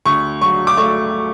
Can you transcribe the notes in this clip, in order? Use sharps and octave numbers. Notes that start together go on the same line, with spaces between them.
D2 C#6
F#3 C#6
D6
A3 C#6